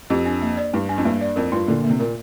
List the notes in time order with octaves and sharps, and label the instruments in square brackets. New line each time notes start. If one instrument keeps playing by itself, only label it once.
[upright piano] F2 [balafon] G4
[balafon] D4
A#3
D5
[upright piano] G2 [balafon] G4
[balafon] D4
[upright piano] F2
[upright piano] G2 [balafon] A#3
[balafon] D5
[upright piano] F2 [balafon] A#4
[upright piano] G2 [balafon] F4
[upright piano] A#2 D3 [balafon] A#3
[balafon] A#3
[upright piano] C3
[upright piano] A#2 [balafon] A#4